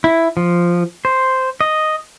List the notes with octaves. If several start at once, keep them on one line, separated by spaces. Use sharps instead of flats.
E4
F3
C5
D#5